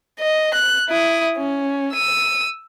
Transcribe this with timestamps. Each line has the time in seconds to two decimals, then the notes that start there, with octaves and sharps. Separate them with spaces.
0.20 D#5
0.54 F#6
0.89 E4 D#6
1.38 C#4
1.93 E6 D#7